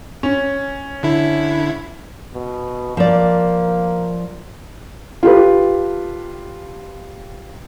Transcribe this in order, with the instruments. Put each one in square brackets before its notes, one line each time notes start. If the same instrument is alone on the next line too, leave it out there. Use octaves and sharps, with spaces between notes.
[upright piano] C#4
[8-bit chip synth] D3 E4
[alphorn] B2
[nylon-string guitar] F3 D5 [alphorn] A#3
[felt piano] F4 G4 A4 B4